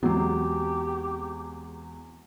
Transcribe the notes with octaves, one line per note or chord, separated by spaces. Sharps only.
E2 F#3 G#3 B3 C4 G4